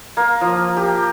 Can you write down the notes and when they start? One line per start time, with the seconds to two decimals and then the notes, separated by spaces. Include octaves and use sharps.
0.17 A#3
0.41 F3
0.77 G4